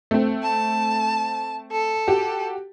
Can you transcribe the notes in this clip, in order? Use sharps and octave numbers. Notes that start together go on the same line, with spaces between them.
A3 C4
A5
A4
F#4 G4